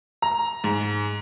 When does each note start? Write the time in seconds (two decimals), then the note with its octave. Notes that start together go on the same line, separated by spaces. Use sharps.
0.22 A#5
0.64 G#2